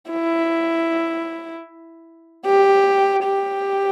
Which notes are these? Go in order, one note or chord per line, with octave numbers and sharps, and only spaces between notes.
E4
G4
G4